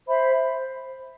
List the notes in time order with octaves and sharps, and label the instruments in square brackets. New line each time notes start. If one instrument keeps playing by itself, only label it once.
[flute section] C5 E5 B5